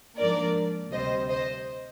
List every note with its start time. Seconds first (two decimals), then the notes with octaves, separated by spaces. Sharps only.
0.18 G#2 F3 A#3 D4 A#4 D5
0.92 D2 C3 G3 C5 D#5
1.29 C5 D#5